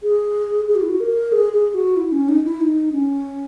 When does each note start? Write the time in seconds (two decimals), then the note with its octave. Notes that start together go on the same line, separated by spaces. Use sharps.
0.03 G#4
0.68 G#4
0.75 F#4
0.82 E4
0.90 F#4
1.00 A#4
1.32 G#4
1.53 G#4
1.74 F#4
1.97 E4
2.12 C#4
2.29 D#4
2.45 E4
2.61 D#4
2.93 C#4